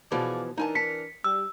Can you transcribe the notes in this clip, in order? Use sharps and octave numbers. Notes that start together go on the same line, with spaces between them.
B2 E3 F3 G#4 D5 F5
E3 D4 D#4 A#4 G#5 A5
A5 B6 C#7
G3 E6